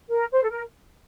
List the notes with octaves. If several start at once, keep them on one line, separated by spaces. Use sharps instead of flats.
A#4
C5
A4
A#4